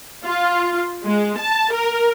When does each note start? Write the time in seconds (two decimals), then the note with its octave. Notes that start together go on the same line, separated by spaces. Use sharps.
0.25 F4
1.04 G#3
1.38 A5
1.72 A#4